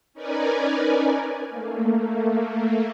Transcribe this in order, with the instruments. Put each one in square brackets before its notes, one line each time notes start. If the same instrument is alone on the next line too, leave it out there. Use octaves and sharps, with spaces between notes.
[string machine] C#4 D#4 A#4 B4 D5 G#5
A3 A#3